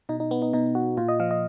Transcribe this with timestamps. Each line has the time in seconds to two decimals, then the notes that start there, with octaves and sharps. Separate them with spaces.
0.09 B2 D#4
0.20 D#4
0.31 B3
0.42 D#4
0.53 B2 D#4
0.75 F#4
0.97 A#2 F4
1.09 D#5
1.20 F3 F5
1.31 D#5